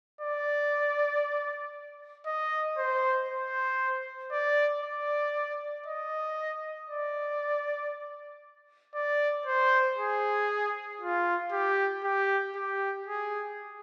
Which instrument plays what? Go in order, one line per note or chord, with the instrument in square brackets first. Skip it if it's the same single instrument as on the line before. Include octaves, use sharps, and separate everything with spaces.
[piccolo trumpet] D5
D#5
C5
C5
D5
D5
D#5
D5
D5
C5
G#4
F4
G4
G4
G4
G#4